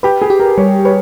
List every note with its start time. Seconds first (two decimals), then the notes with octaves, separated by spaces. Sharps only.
0.03 G4 B4
0.22 G#4
0.30 G4
0.40 A#4
0.58 G3 C#5
0.85 B4 C#5